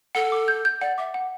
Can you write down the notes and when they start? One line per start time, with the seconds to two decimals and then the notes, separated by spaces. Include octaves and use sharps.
0.15 A4 F#5
0.32 D6
0.48 G6
0.65 G6
0.81 D5 F#5
0.98 E5 D6
1.14 F#5